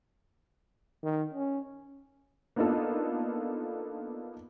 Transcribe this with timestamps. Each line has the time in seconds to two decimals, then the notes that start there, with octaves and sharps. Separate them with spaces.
1.03 D#3
1.34 C#4
2.56 A#3 B3 D4 D#4 F4 A4